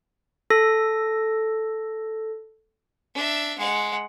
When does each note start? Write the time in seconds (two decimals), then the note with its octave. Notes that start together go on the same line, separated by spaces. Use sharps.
0.50 A4 A#6
3.15 D4 E5
3.58 G#3 F#5